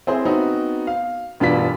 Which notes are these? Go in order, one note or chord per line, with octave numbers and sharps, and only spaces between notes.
C4 E4 G#4 C5
B3 C4 D#4 F#4
F5
E1 G2 B3 F4 D5 B6